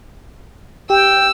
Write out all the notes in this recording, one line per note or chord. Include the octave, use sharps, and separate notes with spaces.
G4 G5 E6